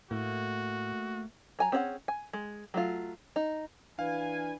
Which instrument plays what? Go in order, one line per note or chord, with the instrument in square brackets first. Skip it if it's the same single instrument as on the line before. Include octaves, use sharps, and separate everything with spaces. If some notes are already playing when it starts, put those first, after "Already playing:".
[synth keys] A2 [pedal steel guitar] A3 A#3 [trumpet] F#4
[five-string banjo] F#3 G#5 A#5
C4 C#4 G#4 B4 F#5
G#5
G#3
F#3 A3 F4
D#4
[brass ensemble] E3 B4 G#5 [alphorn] D4 [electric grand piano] F5